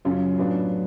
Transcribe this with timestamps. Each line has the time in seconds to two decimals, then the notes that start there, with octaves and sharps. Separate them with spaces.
0.05 F#2 C#3 F#3 C#4 F4
0.38 A2 F#3 B3 D4 F4